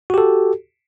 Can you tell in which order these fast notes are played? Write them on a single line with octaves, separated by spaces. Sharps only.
F#4 G4 A4